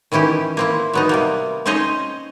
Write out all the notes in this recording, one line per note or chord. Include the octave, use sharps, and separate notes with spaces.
D#3 E3 C#4 E4 G4
A#3 C4 E4
F#3 B3 D#4
C3 G3 A#3
C4 C#4 D#4 C5 C#5 D#5